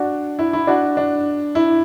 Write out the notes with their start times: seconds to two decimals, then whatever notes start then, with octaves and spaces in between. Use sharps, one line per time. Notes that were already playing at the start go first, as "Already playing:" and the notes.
Already playing: D4 F#4
0.39 E4
0.53 E4
0.67 D4 F#4
0.97 D4
1.55 E4